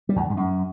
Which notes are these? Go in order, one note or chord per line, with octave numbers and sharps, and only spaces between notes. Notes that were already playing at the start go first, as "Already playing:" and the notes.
G3
E2
D3
G#2
F#2